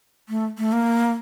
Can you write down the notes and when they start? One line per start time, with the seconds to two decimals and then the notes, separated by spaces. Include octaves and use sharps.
0.29 A3
0.58 A3
0.72 A#3